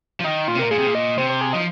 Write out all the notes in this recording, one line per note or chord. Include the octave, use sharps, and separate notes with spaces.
F3
D#3 D#4
A#2 F4
C3
A#2 A#4
A#2 G#4
C3
A#2
D#5
C3 C5
C5
G#4
F3 D#4